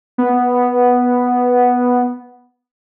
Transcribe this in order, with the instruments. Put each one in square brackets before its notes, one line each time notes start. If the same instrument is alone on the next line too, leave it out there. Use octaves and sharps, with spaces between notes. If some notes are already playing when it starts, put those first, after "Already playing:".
[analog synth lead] B3